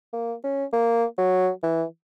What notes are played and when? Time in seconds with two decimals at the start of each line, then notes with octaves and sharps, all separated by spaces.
0.13 A#3
0.44 C#4
0.73 A#3
1.18 F#3
1.63 E3